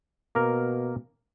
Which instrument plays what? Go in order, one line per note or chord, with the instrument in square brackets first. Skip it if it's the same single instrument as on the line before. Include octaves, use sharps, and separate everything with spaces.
[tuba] B2 [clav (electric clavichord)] A#3 A#4